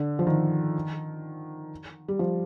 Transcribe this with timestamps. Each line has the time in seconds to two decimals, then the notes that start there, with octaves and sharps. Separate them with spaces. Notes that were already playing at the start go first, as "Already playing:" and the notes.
Already playing: D3
0.19 F3
0.27 D#3
2.08 G3
2.19 F3